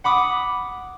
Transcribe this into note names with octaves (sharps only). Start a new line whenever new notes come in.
F#5 B5 D6 D#6